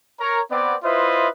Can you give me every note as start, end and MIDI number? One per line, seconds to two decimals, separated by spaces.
0.20 0.41 70
0.20 0.41 73
0.20 0.41 82
0.51 0.76 59
0.51 0.76 60
0.51 0.76 74
0.83 1.28 64
0.83 1.28 65
0.83 1.28 71
0.83 1.28 72
0.83 1.28 75
0.83 1.28 76